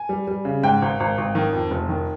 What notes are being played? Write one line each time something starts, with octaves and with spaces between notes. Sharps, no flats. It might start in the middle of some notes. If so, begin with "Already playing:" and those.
Already playing: G#5
G3
G3
C#3
G#2 G5
G#1
G#1
G#1
D#3
F2
F1
D#3